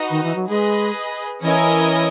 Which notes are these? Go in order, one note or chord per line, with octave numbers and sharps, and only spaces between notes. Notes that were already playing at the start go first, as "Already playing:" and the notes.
Already playing: D#4 F#4 B4 D#5
D#3
E3
F#3
G#3 G#4 B4 D#5
E3 C#4 E4 A#4 D#5 G#5